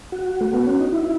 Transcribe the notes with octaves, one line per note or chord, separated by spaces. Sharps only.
F#4
A3
B3
C#4
D#4
E4